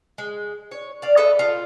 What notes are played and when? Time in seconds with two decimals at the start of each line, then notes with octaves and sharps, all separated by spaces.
0.18 G#3
0.71 C#5
1.02 D5 F5
1.17 A4 B4 D#5 E5
1.39 F4 A4